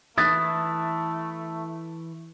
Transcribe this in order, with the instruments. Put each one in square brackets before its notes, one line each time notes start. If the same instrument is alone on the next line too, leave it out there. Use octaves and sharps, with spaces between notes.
[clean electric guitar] E3 E4 [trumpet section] A3 [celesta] D#6 [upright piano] F#6 A6 B6